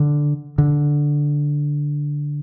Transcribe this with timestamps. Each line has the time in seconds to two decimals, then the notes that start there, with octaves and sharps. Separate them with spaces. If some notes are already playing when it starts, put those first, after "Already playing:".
Already playing: D3
0.58 D3